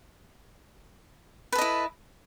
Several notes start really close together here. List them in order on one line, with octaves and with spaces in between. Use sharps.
B4 A4 D#5 E4